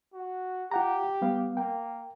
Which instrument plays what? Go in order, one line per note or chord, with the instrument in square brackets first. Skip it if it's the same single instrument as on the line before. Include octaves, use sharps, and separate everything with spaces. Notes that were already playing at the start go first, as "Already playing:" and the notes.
[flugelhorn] F#4
[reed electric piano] F4 F#5 A#5 [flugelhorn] G4
[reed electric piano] G3 B3 F5
[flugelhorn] A#3 [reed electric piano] G5